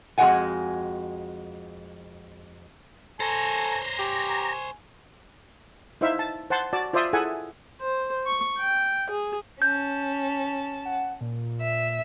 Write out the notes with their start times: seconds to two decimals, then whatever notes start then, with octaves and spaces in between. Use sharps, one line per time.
0.18 F2 G#3 F#4 C#5 F#5 G#5
3.20 A4 C5 C#5 G#5 A#5
3.99 G4 G#5
6.01 D#4 E4 C5 E5 F5
6.19 A5
6.50 C5 F#5 A5 C6
6.73 F#4 D5 A5
6.93 F4 C5 D5 E5 C6 D#6
7.13 E4 G#4 A4 E5 F#5 G#5
7.81 C5
8.27 C#6
8.59 G5
9.11 G#4
9.62 C#4 A5 G6
10.85 F#5
11.21 A#2
11.61 E5